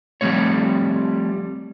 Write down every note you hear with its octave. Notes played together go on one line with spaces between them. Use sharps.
F3 G3 A3 C4 C#5